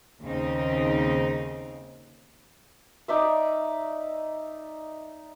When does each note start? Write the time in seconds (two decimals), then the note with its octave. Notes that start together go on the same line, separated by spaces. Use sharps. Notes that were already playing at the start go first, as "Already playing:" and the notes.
0.21 D#2 C#3 C4 D#4
3.08 D#4 D5 E5